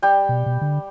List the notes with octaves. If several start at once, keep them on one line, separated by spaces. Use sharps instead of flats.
G3 G5
B2
B2
D3